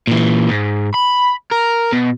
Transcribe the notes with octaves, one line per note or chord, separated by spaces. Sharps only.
A#2 E3
G#2
B5
A#4
B2